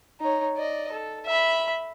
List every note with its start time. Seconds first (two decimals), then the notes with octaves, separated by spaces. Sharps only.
0.20 D#4 C#5
0.56 D5 D#5
0.92 A4
1.26 E5 B5